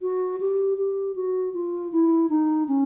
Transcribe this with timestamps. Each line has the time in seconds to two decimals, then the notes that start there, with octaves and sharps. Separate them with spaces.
0.02 F#4
0.40 G4
0.78 G4
1.16 F#4
1.54 F4
1.92 E4
2.30 D#4
2.68 C#4